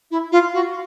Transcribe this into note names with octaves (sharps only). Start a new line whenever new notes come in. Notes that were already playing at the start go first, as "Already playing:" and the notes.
E4
F4
F#4